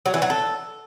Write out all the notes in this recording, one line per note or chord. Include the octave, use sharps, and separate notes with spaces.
F#3
E3
F#3
A4